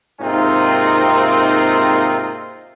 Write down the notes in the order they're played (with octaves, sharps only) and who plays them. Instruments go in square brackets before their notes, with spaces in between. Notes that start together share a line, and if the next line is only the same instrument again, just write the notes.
[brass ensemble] G#2 C3 A#3 C4 D#4 F4